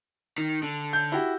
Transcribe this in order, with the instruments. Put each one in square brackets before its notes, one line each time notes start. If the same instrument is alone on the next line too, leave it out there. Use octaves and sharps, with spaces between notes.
[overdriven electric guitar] D#3
D3
[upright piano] G6
E4 F#4 G4